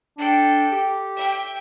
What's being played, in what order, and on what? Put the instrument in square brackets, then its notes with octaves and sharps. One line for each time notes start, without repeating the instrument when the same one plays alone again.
[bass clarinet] D4 [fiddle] A4 G5
[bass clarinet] G4
[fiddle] E5 G5